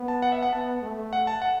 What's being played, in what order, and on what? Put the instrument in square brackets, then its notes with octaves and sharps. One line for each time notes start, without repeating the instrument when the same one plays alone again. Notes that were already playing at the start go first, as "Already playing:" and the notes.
Already playing: [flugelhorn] B3
[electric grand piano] A5
F#5
E5
F#5
[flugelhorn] B3 [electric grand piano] A5
[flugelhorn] A3
[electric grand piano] F#5
A5
F#5